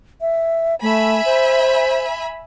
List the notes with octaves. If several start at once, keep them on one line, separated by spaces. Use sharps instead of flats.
E5
A3 E5 G#5 B5
C5